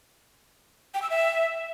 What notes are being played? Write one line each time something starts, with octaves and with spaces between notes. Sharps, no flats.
G5
E6
E5